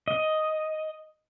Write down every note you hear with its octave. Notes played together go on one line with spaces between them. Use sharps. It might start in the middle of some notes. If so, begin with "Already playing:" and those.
D#5